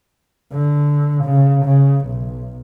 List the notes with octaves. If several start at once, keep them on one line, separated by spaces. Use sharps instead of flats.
D3
C#3
C#3
B1